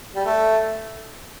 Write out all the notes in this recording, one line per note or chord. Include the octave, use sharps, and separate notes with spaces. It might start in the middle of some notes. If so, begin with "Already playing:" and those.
G3
A3